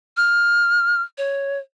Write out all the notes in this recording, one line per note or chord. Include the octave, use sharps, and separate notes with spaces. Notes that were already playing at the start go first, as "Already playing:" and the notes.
F6
C#5